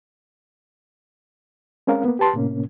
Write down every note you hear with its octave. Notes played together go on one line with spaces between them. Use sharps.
G#3 C4 C#4 A#4 F5
A#3 B3
G4 B4 A5 C6
A2 C3 A#3 C#4